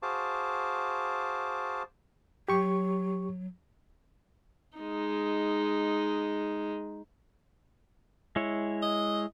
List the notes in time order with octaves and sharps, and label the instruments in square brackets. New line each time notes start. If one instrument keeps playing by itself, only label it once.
[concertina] F#4 G#4 C5 F5 A5 D6
[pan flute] F#3 [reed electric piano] G4 C#6
[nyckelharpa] G#3 D#4
[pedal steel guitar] G#3 E4 C#5
[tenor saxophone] D#5